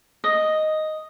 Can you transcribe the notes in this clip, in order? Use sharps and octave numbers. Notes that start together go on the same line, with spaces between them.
D#5